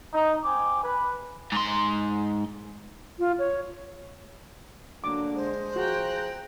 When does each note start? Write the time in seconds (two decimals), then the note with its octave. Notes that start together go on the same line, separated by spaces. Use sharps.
0.14 D#4
0.45 C4 G#5 D6
0.84 B4
1.52 G#2 C6
3.19 F4
3.39 C#5
5.04 D3 F#3 A#3 D4 D6
5.35 G#3 C5
5.76 F3 F#4 G#4 G5 A#5 F#6